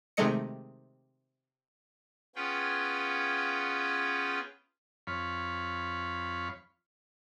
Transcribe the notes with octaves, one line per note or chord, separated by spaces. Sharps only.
C3 D#3 G#3 A3 D#5 C#7
B3 C#4 F4 G#4 G5
F2 C#5 F5 B5